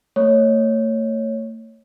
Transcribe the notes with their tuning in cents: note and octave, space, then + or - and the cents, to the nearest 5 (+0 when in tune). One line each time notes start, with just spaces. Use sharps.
A3 +40 C#5 +0